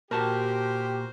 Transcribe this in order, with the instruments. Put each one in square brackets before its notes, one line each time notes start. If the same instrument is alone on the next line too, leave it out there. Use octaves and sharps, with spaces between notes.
[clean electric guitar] A#2 A5 [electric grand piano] F#4 A#4 [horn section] G4 [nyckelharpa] C5